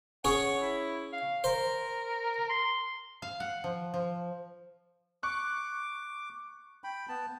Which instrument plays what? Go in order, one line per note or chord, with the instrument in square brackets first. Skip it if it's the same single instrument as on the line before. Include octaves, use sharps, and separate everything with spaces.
[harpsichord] C#4 G#4 C#5 [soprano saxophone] F#5
[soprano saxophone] E4
F5
[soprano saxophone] A#4 [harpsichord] C5
[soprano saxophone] C6
[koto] F5
F#5
F3
F3
[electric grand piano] C#6 F#6 [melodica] D6
[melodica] G5 B5
B3 A5